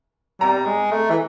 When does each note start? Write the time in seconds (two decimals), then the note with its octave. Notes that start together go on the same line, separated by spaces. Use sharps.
0.40 G3 A#5
0.66 G#3
0.92 A3
1.10 E3